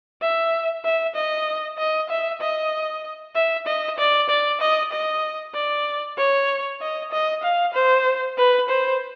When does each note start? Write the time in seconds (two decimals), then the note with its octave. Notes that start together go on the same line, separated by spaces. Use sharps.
0.21 E5
0.85 E5
1.15 D#5
1.78 D#5
2.09 E5
2.41 D#5
3.35 E5
3.67 D#5
3.98 D5
4.29 D5
4.61 D#5
4.92 D#5
5.55 D5
6.18 C#5
6.81 D#5
7.12 D#5
7.43 F5
7.74 C5
8.37 B4
8.69 C5